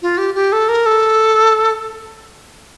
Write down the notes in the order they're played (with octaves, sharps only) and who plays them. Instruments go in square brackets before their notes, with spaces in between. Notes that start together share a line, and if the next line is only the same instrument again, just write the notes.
[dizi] F4
G4
G4
A4
A#4
A4